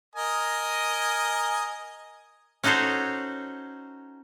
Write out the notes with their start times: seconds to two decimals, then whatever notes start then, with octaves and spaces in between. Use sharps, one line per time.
0.16 A#4 D#5 G#5
2.63 C#4 D#4 F#4 A4 C5 C#5